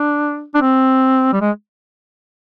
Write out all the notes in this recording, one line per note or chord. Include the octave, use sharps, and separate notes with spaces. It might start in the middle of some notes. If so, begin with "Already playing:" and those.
Already playing: D4
D4
C4
G3
G#3